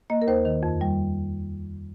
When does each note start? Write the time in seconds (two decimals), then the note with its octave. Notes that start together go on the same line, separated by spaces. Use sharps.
0.10 A#3 D#5
0.22 A#4
0.27 D#2 C5
0.45 D#3
0.63 F2
0.81 G3